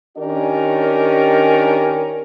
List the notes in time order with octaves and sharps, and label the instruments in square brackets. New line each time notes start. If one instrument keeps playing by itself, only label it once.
[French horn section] D#3 C#4 D4 G4 A#4 D5